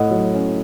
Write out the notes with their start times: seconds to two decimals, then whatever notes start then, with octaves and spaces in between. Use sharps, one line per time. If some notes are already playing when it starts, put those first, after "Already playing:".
Already playing: A2 D#5 F#5
0.11 F#3
0.34 C#4